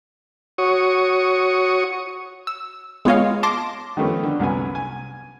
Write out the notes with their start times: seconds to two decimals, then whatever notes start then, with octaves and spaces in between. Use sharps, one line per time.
0.58 F#4 C#5 C#6 D#6
2.47 E6
3.05 G#3 B3 F4 C#5 D#5 F5
3.43 A5 C6 D6 A#6
3.97 D#3 F3 A3 B3 C#4
4.23 D3
4.40 C2 F#2 B3 G#5
4.75 G#5